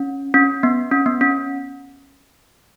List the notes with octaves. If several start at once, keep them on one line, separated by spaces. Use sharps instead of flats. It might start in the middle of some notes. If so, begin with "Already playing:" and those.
Already playing: C#4
C#4
B3
C#4
B3
C#4